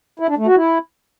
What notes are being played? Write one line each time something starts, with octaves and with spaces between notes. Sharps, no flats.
E4
D4
A3
F#4
E4